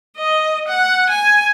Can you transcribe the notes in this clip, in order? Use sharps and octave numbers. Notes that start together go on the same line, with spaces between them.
D#5
F#5
G#5